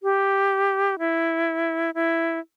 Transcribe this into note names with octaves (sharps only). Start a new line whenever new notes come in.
G4
E4
E4